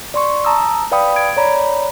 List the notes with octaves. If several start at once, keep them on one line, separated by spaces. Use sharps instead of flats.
D5 C6 C#6
A5 A#5 D#6 E6
B4 D5 F5 G5 B5 D#6
G#6 D7
C#5 D5 A#5 B5